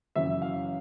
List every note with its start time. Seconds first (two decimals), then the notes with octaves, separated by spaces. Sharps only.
0.16 F#2 C#3 E3 E5
0.42 F5